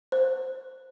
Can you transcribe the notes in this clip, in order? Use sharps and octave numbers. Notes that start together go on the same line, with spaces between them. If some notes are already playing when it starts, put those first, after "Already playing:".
C5